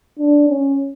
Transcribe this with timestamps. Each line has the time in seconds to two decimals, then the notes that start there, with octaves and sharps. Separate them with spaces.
0.19 D4
0.49 C#4